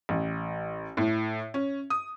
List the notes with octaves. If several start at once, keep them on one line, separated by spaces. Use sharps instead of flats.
A1
A2
C#4
D#6